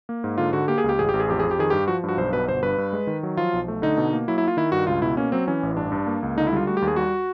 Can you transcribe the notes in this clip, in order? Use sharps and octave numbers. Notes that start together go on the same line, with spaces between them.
A#3
G#2
D3 F4
D3 F#4
A#3 G4
G#4
C#2
G4
A1 G#4
A1 G4
G#4
F2 G4
F2 G#4
G4
D#3 G#4
G2 G4
F3 F#4
G2 F#4
B1 C5
B2 B4
G1 C5
G2 B4
G2
G#3
D#3
F#3
F3 F4
B1
A3
D3 D#4
B2
A#3
F#3 E4
E4
A#3
F4
D#3 E4
G2 F#4
C#2 F4
B2 E4
A#3 C#4
F#3 C4
E3 C#4
A1
G2 D4
G2
A#3
C#2
D3 D#4
E4
G3 F4
A3 F#4
G4
D#2
G#4
G3 F#4